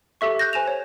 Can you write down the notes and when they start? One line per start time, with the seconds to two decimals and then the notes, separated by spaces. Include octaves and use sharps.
0.21 G4 A4 E5 C#6
0.39 F#6 G6 A#6
0.53 C5 G#5 E7 F7
0.68 C#5